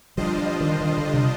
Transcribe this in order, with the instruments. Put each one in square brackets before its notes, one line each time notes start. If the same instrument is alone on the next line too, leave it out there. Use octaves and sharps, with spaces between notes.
[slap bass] F3 [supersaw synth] G3 D4 F4 C5 D#5
[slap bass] F3
D#3
D#3
D3
C3